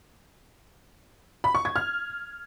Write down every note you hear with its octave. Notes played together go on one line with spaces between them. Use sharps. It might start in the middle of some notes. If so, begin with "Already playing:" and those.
B5
C#6
G#6
F6